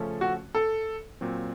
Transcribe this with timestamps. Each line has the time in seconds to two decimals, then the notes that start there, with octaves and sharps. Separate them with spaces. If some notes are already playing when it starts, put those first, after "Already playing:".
Already playing: C#3 F3 A3 C#4 A4
0.21 F#4
0.55 A4
1.21 A#2 F#3 C4